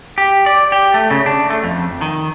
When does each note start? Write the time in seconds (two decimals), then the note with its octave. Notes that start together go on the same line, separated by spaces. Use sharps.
0.18 G4
0.46 D5
0.72 G4
0.94 A3
1.11 C#3
1.26 D4
1.50 A3
1.64 F2
2.01 D#3